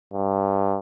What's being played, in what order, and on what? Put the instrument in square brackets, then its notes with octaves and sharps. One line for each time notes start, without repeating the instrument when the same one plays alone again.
[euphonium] G2